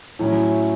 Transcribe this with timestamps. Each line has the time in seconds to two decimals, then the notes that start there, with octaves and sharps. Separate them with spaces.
0.19 A2 F#3 C#4 E4